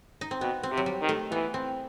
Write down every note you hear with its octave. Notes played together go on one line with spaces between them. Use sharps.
D#4
C4
B2 B3
C4
C3
F#3
G3
D#3
A3
E3 B3
C4